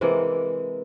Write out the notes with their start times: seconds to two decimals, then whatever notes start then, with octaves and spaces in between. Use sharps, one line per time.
0.01 C3 E3 G#3 A#3